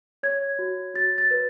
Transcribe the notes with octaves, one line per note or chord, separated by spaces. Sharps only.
C#5 G#6
F#4
F#4 A6
A6
B4